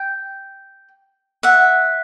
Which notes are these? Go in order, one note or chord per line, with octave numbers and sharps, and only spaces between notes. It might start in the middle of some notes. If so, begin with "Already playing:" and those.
Already playing: G5
E5 F#5